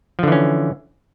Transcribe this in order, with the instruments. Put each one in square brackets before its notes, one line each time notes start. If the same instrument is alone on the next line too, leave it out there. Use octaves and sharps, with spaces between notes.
[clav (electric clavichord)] F3
D3
E3
C#4